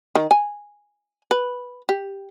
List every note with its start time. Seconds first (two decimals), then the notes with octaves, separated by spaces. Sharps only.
0.15 D#3
0.31 G#5
1.31 B4
1.89 G4